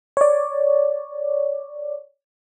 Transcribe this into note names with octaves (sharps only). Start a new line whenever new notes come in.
C#5 D5